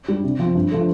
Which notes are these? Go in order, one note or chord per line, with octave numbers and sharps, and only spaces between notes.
G3 D4
C3
F3 C4
G2
F3 A3